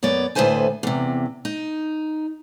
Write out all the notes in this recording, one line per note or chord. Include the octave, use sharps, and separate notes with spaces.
F#2 B3 C#5 D5
D2 A2 C3 B4 C5 G#5
E2 C3
D#4